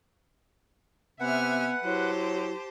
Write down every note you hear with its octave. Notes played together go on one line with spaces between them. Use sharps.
C3 B3 B4 E5 F#5 G#5 F6
F#3 E4 G4 C5 A5